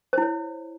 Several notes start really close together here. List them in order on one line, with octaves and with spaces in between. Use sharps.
C5 E4 C#5